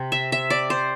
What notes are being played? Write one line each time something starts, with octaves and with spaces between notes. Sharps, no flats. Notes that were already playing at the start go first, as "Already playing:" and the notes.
Already playing: C3
E5
E5
D5
C5